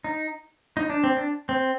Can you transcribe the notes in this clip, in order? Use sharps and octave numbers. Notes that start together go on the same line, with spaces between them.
D#4
D#4
D4
C4
D4
C4